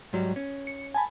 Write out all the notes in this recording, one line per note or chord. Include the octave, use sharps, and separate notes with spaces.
G#2 F#3 G3
C#4
C#7
G#5 A5 B5